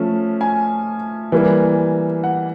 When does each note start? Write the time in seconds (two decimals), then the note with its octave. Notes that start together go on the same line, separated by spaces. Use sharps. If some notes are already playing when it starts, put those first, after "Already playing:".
Already playing: F3 A3 C#4
0.41 G#5
1.32 E3 G3 A#3
2.24 F#5